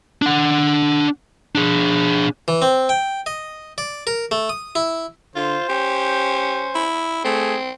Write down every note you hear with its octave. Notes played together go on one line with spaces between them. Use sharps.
D4 F#5
D4 G#4
E3
C4
G5
D#5
D5
A#4
A3
D#6
E4
D3 F4 C5
C#4 G4
E4
A3 C4 G#4